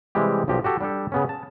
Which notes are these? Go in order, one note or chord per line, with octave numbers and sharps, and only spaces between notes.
C3 E3 G3 G#3 G4
B1 F3 G4 D#5
F#4 G4 A4
G3 D4 G4 A4
C#3 B3 C#4
A5